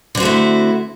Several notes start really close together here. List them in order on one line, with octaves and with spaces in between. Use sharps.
D3 C4 F#4 A3 E4